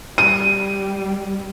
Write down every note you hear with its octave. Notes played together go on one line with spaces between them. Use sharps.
G3 D#7